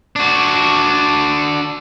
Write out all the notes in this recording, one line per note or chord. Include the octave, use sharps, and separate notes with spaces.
D4 F#4